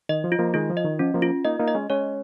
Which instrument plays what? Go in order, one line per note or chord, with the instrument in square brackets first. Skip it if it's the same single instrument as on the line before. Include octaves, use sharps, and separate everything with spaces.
[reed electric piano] D#3 [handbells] D#5
[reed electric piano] F3
[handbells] F4
[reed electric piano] F3 A#3
[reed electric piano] D#3 G#3 [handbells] F4
[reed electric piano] F3
[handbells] D#5
[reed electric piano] D#3
[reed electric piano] F3 [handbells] C#4
[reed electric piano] F3 A#3
[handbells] F4
[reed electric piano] A#3 D#4 [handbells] D#5
[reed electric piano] A#3 D#4
[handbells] D#5
[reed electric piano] G#3 C#4
[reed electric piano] G#3 C#4 [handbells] C#5